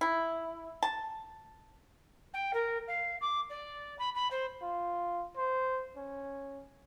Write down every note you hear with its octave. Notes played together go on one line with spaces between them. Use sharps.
E4
A5
G5
A#4
F5
D6
D5
B5
B5
C5
F4
C5
C#4